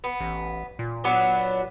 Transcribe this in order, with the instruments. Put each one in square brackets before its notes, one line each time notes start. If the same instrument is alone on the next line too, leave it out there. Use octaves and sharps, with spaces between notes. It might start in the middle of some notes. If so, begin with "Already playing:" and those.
[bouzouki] B3
[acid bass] A1
A#2
[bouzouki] F#3 B3 D4